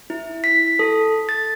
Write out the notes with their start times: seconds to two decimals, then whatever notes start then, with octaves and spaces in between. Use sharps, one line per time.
0.10 E4
0.44 B6
0.79 A4
1.29 A6